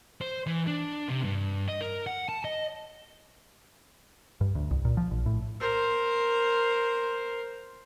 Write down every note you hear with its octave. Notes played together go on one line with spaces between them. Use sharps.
C5
E3
D4
C3
G2
D#5
A#4
F#5
A5
D#5
G2
D2
C2
A#2
F3
A#1
A2
A#4 C5